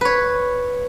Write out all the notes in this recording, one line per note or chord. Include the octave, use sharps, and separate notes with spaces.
B4 C#5